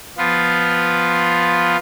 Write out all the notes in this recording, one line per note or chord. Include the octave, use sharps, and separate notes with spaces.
F3 B3 F4